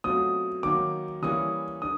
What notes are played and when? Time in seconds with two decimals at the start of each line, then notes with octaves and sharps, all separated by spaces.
0.04 B2 F#3 A3 C4 F4 D#6
0.63 D#3 F#3 A#3 D6
1.22 E3 G3 A#3 C#4 E4 D#6
1.82 D3 D#6